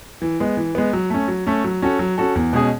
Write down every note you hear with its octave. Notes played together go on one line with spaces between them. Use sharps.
E3
G#3 B3
E3
G#3 B3
F#3
A3 C#4
F#3
A3 C#4
F#3
C#4 F#4 A4
F#3
C#4 F#4 A4
E2
B2 G#3 C#4 G#4